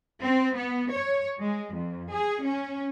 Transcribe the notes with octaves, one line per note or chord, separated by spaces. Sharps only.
C4
B3
C#5
G#3
F2
G#4
C#4